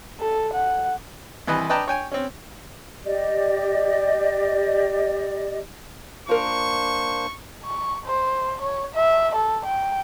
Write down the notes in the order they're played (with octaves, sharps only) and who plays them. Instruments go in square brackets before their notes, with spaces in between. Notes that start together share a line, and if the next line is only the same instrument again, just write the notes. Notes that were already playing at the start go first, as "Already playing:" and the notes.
[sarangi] A4
F#5
[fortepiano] C2 E3 B4 D#5
B4 D5 D#5 G5 A5 A#5
C#5 G5 G#5
C4 C#4
[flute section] G4 D5 D#5
[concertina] A#3 D4 C5 [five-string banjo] F4 A#4 [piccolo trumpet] C#6
[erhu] C#6
C5
C#5
E5
A4
G5